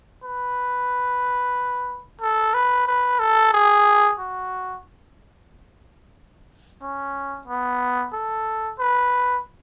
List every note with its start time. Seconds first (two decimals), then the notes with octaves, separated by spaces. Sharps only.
0.24 B4
2.21 A4
2.54 B4
2.88 B4
3.19 A4
3.53 G#4
4.19 F#4
6.82 C#4
7.47 B3
8.13 A4
8.79 B4